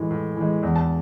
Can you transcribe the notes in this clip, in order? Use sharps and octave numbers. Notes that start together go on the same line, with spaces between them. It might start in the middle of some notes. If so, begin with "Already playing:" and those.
Already playing: A2 E3 G#3
A2
E3 G#3
E2
A5